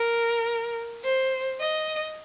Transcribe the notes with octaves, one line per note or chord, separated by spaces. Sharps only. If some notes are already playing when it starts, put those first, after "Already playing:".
Already playing: A#4
C5
D#5